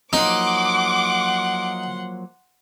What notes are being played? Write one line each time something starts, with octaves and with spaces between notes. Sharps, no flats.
F3 F#3 A#3 D#4 F#5 C6 D6